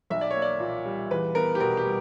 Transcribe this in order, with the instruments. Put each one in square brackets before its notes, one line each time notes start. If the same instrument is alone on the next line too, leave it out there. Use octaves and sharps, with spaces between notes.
[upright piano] B1 E5
D5
A#3 C#5
D5
A#2
G3
E2 B4
B3 A#4
G4
B2 A#4
G4
G3